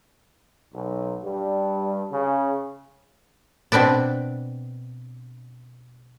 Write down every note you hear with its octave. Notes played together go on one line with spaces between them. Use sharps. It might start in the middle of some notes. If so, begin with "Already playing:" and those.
B1
G2
C#3
B2 C4 D4 B4 D5